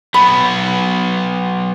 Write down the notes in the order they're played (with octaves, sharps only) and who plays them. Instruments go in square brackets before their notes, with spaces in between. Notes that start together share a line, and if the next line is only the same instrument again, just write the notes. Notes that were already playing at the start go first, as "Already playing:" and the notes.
[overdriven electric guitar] F#3 B3 [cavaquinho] B5